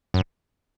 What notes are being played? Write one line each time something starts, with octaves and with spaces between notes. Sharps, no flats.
F#2